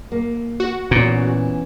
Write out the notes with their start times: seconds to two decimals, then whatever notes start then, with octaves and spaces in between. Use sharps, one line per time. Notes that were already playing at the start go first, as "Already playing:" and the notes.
0.12 A#3
0.60 F#4
0.91 A#2 E3 B3 C#4